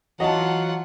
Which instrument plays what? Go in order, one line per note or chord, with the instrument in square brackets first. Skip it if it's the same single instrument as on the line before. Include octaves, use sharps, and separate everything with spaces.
[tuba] E3 [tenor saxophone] F#3 [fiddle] F4 F#5 [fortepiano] D#5 A5